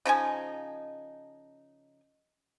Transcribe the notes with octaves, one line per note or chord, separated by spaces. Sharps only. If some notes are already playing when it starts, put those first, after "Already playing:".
C#3 F3 D#4 G#5